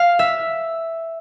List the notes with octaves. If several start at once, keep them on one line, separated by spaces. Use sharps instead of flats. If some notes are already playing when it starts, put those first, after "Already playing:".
Already playing: F5
E5